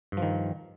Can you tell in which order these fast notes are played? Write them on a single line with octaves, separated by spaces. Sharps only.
G2 F3 D#3